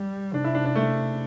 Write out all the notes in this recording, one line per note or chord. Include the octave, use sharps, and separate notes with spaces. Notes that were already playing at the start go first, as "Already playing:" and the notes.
Already playing: G3
C3 D4
E4
D4
D4
A3